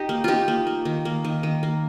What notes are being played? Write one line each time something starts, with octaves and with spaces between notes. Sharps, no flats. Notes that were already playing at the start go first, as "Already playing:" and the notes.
Already playing: D#4 G4
A#3
A#3 D#4 F4 G4
A#3
A#3
D#3
A#3
D#3
D#3
A#3